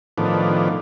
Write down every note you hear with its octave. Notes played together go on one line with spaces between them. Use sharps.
A2 D#3 F3 B3 D4